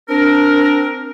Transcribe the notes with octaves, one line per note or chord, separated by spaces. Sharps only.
C4 D4 A#4